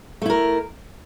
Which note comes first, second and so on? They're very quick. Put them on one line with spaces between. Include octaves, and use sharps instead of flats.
A3 E4 A#4